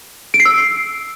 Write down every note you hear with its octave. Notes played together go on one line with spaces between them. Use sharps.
D7
C7
E6